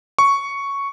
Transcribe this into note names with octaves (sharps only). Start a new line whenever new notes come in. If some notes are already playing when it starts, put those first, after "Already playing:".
C#6